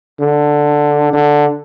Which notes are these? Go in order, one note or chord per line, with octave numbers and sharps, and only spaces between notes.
D3
D3